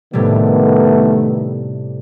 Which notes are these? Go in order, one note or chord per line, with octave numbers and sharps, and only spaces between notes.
A2 C3 D#3 G3 A3 B3